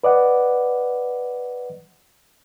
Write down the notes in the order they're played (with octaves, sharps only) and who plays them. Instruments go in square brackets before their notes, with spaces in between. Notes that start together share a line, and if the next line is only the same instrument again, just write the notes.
[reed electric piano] B4 D5 D#5 F#5